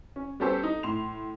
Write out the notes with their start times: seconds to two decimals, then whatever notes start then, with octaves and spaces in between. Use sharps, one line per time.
0.16 C#4
0.40 G3 B3 C#4 G4 A4 C5
0.63 D#4
0.83 A2 C6 F7